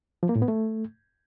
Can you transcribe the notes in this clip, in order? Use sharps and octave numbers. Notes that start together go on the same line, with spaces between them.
F3
A#3
A2
B3
A3